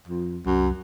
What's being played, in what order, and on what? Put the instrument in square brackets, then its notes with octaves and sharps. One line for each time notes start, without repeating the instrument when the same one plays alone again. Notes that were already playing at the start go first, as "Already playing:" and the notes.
[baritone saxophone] F2
[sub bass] C2 [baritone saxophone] F#2